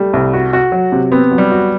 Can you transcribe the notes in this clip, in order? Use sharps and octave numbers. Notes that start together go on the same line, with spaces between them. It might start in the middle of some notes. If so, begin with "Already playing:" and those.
Already playing: G3 A3
C2
F#4
F#4
F#3
C3
B3 C4
F#3
G3
F#4